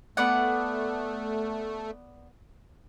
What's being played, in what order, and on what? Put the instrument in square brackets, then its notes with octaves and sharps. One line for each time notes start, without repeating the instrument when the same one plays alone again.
[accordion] A3 [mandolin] B3 D5 F#5